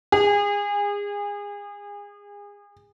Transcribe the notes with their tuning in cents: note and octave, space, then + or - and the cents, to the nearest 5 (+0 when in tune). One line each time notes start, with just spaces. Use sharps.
G#4 -30